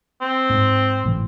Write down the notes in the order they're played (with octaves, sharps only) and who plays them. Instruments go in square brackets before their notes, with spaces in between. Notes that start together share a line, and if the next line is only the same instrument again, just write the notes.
[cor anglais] C4
[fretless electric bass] G#2
G#1 A2 E3